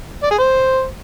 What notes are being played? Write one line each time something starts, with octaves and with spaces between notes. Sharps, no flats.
D5
G#4
C5